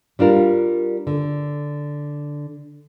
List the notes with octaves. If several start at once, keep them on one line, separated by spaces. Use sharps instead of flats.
G3 D4 F4 A#4
D3